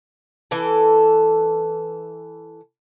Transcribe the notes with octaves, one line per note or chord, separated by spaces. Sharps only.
E3 A4